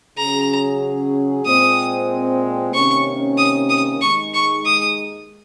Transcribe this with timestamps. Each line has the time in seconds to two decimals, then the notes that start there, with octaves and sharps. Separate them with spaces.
0.18 C#3 F#3 C#4 G#4 A#5
1.45 A#2 G#3 C4 D#6
2.73 C3 D#3 A#3 C#4 C#6
3.37 D#6
3.70 D#6
4.01 D#2 D#3 G#3 D#4 C#6
4.34 C#6
4.65 D#6